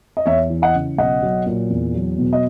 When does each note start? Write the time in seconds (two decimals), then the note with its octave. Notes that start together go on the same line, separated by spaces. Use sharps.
0.17 D#5
0.26 E2 C#5 E5
0.50 E3
0.62 D#5 F#5
0.74 C#3
0.98 B1 D#5 F#5
1.22 F#3
1.46 A#2
1.70 E2
1.94 F#3
2.18 B2
2.33 D#5